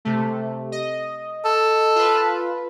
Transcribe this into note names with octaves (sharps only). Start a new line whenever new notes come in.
C3 A3
D#5
A4
F4 B4